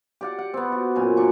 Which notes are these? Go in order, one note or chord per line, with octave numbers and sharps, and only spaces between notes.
G4 D5 F#5
F#5
B3 C4
F#4
F#2 A#2 F4 G#5
F#3 D4 C#6